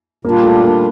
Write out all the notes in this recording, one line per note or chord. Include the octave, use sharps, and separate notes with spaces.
A#2 G3 A#3 D4 F4
A3
A#3